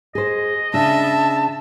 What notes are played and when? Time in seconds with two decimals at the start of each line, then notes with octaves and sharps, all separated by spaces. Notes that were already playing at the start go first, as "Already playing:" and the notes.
0.15 G#4 C5 D#5
0.73 C#3 D4 E5 A5